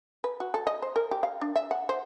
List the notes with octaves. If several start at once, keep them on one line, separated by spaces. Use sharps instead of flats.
B4
F#4
A4
D#5
C5
A#4
G4
F5
D4
E5
F#5
C5